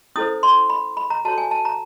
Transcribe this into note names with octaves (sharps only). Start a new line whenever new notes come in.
C#4 E4 A4 C5 D#6
C6
B5
B5
A#5
F#4 A4 C#5 A5
G#5
A5
A#5